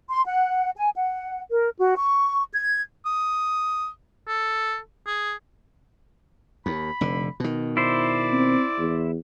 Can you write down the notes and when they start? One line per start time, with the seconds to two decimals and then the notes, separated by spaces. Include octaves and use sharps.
0.09 C6
0.25 F#5
0.76 G#5
0.95 F#5
1.51 A#4
1.78 F#4
1.97 C#6
2.52 G#6
3.06 D#6
4.28 A4
5.07 G#4
6.66 D#2 B5
7.01 F1 D3
7.40 B2 D#3
7.77 E4 C5 D5
8.32 C4
8.78 E2